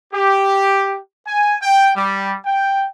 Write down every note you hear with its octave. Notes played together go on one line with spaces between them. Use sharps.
G4
G#5
G5
G3
G5